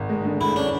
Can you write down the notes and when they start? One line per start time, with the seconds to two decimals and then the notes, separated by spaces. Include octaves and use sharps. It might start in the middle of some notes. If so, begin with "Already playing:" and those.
Already playing: G#1
0.09 G#3
0.25 D3
0.40 D2 E4
0.56 C#4 D4